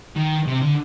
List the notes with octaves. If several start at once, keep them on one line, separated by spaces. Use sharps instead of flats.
D#3
C3
D3